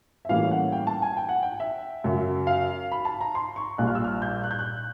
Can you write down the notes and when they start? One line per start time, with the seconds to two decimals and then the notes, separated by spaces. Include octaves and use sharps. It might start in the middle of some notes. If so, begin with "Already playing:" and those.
0.25 E5
0.29 A2 E3 G3 A#3 C#4 F5
0.51 F#5
0.72 G5
0.87 A5
1.02 G#5
1.17 G5
1.29 F#5
1.43 G5
1.60 E5
2.04 F#2 C#3 F#3
2.47 F5
2.92 B5
3.05 A5
3.21 A#5
3.35 C6
3.56 C#6
3.78 A#1 A#2 G3 F#6
3.87 F6
3.95 E6
4.04 F6
4.22 G6
4.44 F#6
4.51 G6
4.59 F#6